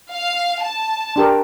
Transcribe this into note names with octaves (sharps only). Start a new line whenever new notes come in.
F5
A5
D4 G4 A#4